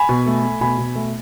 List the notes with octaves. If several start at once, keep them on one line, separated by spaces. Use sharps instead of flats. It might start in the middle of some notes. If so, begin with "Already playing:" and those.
Already playing: G#5 B5
B2
A3
A3
B2 G#5 B5
B2
A3